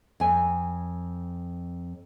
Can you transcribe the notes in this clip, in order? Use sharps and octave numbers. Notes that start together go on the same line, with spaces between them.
F2 G#5